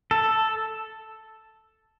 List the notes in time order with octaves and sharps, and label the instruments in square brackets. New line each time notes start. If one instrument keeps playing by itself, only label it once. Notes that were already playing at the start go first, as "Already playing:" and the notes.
[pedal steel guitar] A4